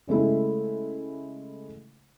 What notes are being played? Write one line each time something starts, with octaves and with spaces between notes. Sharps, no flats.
C#3 G#3 A3 E4